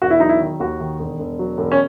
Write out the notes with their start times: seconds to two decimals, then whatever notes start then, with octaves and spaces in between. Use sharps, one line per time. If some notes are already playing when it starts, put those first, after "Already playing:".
0.02 E1 F#4
0.10 E4
0.20 F#3 D#4
0.29 E4
0.40 D#3
0.60 D#2 F#4
0.80 D#3
0.99 E1
1.19 E1
1.39 F#3
1.58 E1
1.72 C#4